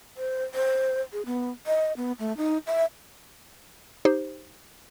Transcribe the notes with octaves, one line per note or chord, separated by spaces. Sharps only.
C5
C5
G#4
B3
D#5
B3
A3
D#4
E5
D#4 G4 C5